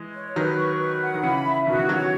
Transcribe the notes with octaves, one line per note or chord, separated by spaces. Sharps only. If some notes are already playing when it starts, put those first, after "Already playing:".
Already playing: E3 G#3
C#5
D#3 F#3 B4
C#6
B4
F#5
D#3
C#3 E3 B5
E5
B2 D#3 F#4
E3
D#3 F#3 C#5